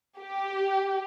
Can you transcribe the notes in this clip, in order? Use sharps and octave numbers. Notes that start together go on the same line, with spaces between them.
G4